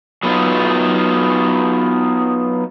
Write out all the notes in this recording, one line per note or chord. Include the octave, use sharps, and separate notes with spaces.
F#3 B3 D#4 F4